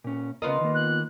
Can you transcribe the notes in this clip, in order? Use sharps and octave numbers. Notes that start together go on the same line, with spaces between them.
A#2 C#4
C#3 B3 F4 A#4 D#5
D#3 A#3
F#6